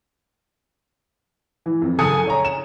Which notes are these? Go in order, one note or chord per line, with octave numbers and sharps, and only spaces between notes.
E3
F2
F#1 C#3 A4 G#5 D#6 C#7
C#5 A#5
E7